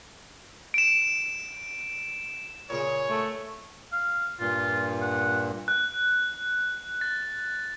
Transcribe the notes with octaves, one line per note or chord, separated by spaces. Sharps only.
D7 E7
A#2 C#3 G#4 C#5
A3
F5
G2 A#2 F4
F#5
F#6
A6